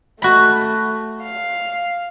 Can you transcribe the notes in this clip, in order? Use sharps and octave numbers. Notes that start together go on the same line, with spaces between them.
A3 F#4 B5
F5